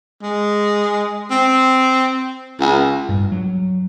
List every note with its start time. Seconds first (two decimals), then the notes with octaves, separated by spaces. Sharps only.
0.23 G#3
1.30 C4
2.60 C#2
3.09 G2
3.32 F#3